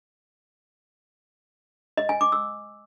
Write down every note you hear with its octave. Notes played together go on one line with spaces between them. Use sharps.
D#5
G#5
D6
E6